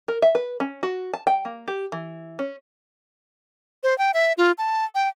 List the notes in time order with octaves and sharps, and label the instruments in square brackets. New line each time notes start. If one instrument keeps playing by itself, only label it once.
[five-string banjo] A#4
E5
B4
C#4
F#4
A5
G5
A#3
G4
E3
C#4
[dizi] C5
G5
E5
F4
A5
G5